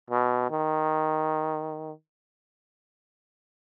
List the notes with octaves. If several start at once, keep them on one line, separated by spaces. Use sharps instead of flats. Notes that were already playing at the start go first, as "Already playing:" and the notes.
B2
D#3